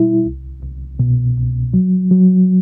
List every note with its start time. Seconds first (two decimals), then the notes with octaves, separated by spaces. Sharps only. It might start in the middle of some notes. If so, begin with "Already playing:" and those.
Already playing: B2 G3 E4
0.26 C2
0.63 C2
1.00 B2
1.37 C2
1.74 F#3
2.11 F#3